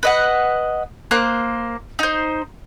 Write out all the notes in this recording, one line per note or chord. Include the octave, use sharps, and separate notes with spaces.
B4 D#5 F#5
A#3 C5 F#6
D#4 C5